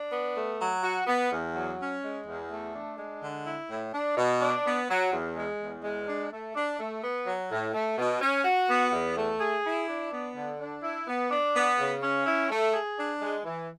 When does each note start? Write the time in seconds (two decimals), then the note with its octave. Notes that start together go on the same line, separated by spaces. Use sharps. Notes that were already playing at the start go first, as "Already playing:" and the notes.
Already playing: D4
0.12 B3
0.35 A3
0.60 F#3
0.84 F#4
1.07 B3
1.31 E2
1.55 F#3
1.79 C#4
2.03 G#3
2.26 E2
2.50 A3
2.74 D4
2.98 G#3
3.22 D3
3.45 E4
3.69 A2
3.93 D4
4.17 B2
4.41 D4
4.65 B3
4.89 F#3
5.12 E2
5.36 G#3
5.59 E2
5.83 G#3
6.07 D4
6.32 A3
6.55 D4
6.79 A3
7.02 B3
7.26 F#3
7.51 A2
7.74 A3
7.98 B2
8.21 C#4
8.45 F#4
8.69 B3
8.92 E2
9.16 A3
9.40 G#4
9.65 E4
9.88 D4
10.11 B3
10.35 D3
10.60 D4
10.83 E4
11.07 B3
11.31 D4
11.55 B3
11.79 C#3
12.02 C#4
12.25 E4
12.50 A3
12.74 G#4
12.98 D4
13.22 G#3
13.45 E3